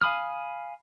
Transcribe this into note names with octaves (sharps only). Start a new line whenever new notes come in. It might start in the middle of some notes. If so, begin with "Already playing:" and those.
F5 G#5 B5 D#6 F6